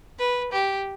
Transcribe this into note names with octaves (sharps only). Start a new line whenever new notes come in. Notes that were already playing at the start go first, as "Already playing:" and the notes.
B4
G4